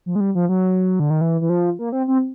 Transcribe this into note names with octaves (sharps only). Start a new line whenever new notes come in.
F3
G#3
G3
F3
F#3
D3
D#3
E3
E3
F3
A#3
C4
C4